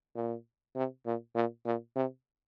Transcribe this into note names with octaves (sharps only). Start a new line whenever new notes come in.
A#2
C3
A#2
A#2
A#2
C3